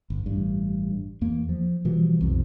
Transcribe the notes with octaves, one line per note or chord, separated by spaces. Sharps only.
G1
A1 G2
E2 A#3
F3
B2 E3 F3 G3
B1 F2 C3